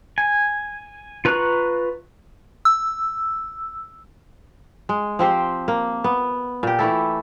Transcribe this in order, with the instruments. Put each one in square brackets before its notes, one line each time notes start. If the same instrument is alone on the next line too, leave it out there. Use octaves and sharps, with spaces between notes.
[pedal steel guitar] G#5
F4 B4 A#5 C#6 F#6
[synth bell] E6
[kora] G#3
F3 C4 G4 C5
A#3
B3
A#2 G4
E3 A3 E4 A4